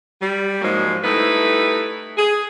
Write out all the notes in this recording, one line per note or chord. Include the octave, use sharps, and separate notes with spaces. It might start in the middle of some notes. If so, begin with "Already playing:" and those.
G3
G#2 F3 F#3 G#3 A#3
G3 A3 D#4 E4 B4
G#4